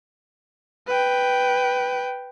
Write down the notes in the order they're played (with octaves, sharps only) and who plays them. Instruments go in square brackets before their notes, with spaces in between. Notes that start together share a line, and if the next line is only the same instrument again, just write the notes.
[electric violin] B4 G5